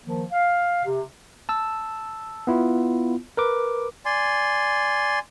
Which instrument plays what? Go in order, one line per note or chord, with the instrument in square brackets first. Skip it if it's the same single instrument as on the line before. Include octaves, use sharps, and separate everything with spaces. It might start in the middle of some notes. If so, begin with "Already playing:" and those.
[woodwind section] D#3 F3 A#3
F5
C3
[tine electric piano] A5 E6
B3 E4 F4
A#4 B4 D6
[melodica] D5 G#5 C6